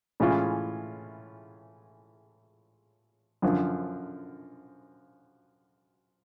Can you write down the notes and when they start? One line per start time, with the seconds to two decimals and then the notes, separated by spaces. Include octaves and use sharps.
0.20 A2 E3 G#3 C#4 F4
3.42 F#2 D3 F3